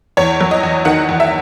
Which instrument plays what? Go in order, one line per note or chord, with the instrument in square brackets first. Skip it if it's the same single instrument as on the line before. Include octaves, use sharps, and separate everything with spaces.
[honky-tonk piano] E2 C#5
F#3
D#5
E2
D#3 F#5
E2
E5